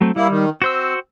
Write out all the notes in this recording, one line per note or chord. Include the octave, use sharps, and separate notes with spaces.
F#3 A3 C4
G3 A#3 E4
D#3
C4 F#4 C5 E6